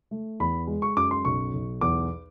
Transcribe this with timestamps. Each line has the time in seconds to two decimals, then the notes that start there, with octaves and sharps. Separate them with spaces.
0.11 A3
0.40 E2 B5
0.67 G#3
0.82 C#6
0.97 F#2 D6
1.11 C6
1.25 B1 C#6
1.53 B1
1.81 E2 D6